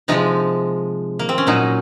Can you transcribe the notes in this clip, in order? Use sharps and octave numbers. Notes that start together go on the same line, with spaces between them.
C3 F3 G#3 D#4
A#3
C4
C#4
A#2 F#3 D#4